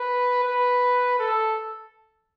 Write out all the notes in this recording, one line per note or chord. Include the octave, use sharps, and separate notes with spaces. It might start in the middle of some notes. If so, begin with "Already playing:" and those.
Already playing: B4
B4
A4